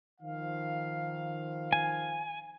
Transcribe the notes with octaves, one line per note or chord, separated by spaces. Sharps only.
D#3 F3 F5
G#5